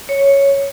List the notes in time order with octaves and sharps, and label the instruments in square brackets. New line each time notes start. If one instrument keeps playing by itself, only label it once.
[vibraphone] C#5